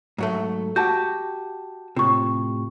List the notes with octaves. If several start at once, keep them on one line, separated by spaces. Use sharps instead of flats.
G#2 F#3 A3
F#4 G4 F#5 A5 G6
A2 C3 F4 C#6